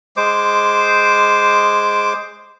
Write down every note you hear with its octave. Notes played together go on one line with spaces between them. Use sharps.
G#3 C5 D6